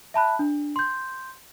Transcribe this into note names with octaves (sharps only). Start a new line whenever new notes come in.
E5 A5 B5 F#6
D4
C6 G6